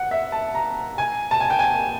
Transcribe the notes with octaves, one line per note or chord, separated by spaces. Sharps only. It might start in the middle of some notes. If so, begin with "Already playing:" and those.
Already playing: F#5
E5
A5
A#5
G#5
A5
G#5
G5
G#5